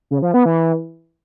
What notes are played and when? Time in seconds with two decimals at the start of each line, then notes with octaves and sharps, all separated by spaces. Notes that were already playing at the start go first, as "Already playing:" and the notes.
0.11 C#3
0.22 F3
0.34 B3
0.46 E3